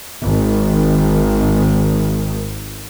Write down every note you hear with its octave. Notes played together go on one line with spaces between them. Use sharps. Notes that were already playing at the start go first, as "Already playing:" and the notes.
G#1 D#3